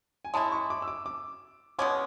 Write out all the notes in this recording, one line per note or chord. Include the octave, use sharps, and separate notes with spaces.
G#5
G#3 C#4 E4 A5
C#6
D6
E6
D6
D6
B2 G#3 C#4 D6